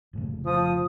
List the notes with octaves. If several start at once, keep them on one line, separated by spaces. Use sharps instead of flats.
F1 A2 C#3
F3 D#6